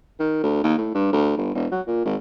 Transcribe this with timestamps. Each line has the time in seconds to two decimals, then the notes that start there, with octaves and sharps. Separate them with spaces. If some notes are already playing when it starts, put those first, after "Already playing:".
0.19 D#3
0.43 D2
0.64 D#2
0.78 A2
0.95 G2
1.13 D2
1.37 G1
1.55 E1
1.71 F#3
1.87 A#2
2.05 G#1